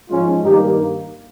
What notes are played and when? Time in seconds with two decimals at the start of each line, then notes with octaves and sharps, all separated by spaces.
0.09 G#2 F3 G#3 C#4 F4
0.43 G2 D#3 A#3 D#4 G4